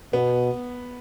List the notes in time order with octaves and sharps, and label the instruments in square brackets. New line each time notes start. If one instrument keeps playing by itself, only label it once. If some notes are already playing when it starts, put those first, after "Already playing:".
[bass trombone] B2 [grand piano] B3